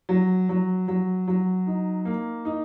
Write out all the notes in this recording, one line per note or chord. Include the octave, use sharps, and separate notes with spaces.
F#3
F#3
F#3
F#3
D#4
A#3
D#4